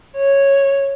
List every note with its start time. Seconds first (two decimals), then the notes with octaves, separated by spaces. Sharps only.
0.17 C#5